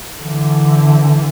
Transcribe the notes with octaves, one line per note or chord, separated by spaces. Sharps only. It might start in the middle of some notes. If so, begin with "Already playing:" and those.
D3 E3